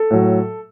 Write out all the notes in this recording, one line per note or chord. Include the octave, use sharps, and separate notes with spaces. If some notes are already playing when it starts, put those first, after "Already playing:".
Already playing: A4
A2 F#3